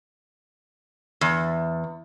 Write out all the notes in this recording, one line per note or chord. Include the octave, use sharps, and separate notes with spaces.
E2